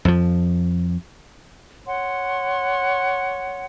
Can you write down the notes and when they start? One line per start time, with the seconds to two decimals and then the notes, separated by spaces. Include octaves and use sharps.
0.05 F2 F3
1.86 C#5 F#5 C6